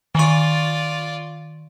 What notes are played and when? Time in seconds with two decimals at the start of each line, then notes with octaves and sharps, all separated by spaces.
0.15 D#3 F4 D5 C#6